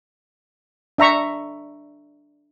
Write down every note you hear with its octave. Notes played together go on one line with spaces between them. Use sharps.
D4 E5 A#5 C#6